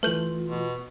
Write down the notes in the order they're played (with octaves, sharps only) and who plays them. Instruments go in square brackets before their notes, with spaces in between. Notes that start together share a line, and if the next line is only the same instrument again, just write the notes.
[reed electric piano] E3 A3 [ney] F4 [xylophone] B4 G6 F#7
[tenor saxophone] B2